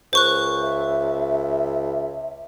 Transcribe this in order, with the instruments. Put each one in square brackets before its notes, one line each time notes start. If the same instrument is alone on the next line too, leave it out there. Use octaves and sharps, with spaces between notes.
[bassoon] C#2 [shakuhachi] A#4 [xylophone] C5 C#6 F#6
[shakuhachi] E5